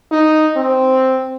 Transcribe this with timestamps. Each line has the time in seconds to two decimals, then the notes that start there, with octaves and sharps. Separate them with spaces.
0.12 D#4
0.56 C4